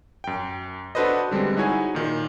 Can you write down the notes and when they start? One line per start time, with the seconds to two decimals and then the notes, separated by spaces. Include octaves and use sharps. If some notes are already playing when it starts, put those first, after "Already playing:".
0.24 F#2 G5
0.95 D4 F#4 A4 B4 C5 D#5
1.31 D3 G3 G#3 C4
1.57 D#4 E4 F#4 G#4 C#5 G#5
1.95 A#2 D#3